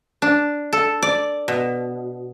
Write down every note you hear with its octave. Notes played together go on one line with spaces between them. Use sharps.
D4
A4
D5
B2